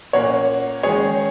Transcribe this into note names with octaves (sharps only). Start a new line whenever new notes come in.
A#2 A#3 C#4 C#5 F#5
D#3 G#3 C#4 G#4 C#5